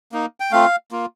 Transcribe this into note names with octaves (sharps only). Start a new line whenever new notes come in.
A#3 D#4
G5
A3 C4 F4 F5
A#3 F4